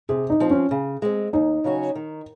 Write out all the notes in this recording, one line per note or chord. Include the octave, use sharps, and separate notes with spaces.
C3 G#4
D#4
F3 C4
C#4
C#3
G#3 C4
D#2 D#4
C#3 F#3 C#4 F#4
D#3